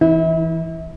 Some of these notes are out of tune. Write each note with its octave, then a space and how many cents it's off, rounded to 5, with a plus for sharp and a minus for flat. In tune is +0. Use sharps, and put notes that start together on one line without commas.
E3 +0 E4 -35